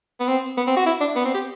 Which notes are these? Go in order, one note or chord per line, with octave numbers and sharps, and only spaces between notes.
B3
C4
B3
C4
F#4
E4
D4
B3
C4
G4